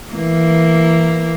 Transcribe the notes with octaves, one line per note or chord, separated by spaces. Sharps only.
E3 A#3